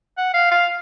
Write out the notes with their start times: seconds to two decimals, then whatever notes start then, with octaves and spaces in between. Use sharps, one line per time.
0.18 F#5
0.34 F5
0.51 F5